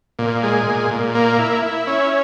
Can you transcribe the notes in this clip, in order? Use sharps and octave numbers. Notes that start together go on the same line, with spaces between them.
A#2
G#3
A#2
A#2
A#3
E4
E4
C#4